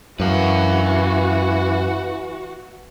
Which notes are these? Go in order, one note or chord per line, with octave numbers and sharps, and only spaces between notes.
F#2 E3 F#4 B4 F5